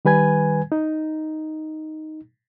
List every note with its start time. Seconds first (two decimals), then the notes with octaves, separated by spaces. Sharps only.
0.05 D#3 G3 B4 G#5 G#6
0.72 D#4